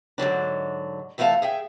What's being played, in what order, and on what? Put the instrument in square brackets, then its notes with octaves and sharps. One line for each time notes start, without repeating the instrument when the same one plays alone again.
[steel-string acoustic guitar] G#2 D3 F#3 D4
E3 A3 E4 G4 F5 A5
G#4 E5 G5